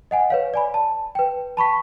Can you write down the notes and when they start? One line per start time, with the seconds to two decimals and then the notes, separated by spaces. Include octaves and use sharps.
0.11 D#5 F#5 G#5
0.30 B4 C#5 F5
0.54 D5 G#5 B5
0.74 A5
1.15 B4 G5
1.57 A5 B5 C#6 B6